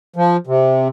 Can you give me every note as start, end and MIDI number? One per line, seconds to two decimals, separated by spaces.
0.16 0.37 53
0.47 0.88 48